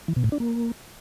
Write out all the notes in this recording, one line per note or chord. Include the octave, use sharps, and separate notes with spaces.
E3
B2
A2
D4
A#3